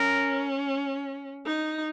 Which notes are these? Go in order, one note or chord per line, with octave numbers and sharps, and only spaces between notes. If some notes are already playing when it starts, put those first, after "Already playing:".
Already playing: C#4 A#4
D#4